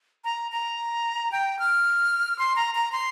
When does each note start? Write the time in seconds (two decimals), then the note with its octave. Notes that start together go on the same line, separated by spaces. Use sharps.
0.24 A#5
0.52 A#5
1.32 G5
1.59 F6
2.39 C6
2.56 A#5
2.75 A#5
2.92 C6